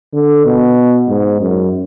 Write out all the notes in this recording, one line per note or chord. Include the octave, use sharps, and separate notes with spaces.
D3
B2
G#2
F#2